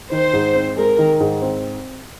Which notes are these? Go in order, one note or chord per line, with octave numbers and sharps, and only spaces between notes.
D#3 C5
G#2
C4
G#3 A#4
D#3
G#2
C4